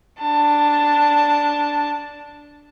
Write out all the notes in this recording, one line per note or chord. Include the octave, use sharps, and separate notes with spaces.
D4 A5